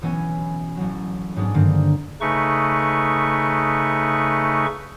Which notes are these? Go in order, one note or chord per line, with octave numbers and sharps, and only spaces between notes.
B1 E3 B3 C#4 G#5
A1 F#3
G#2 F#3 G#3 B3 D4
G2 D3 D#3 A#3 C4
C#3 A3 D#4 B4 C#6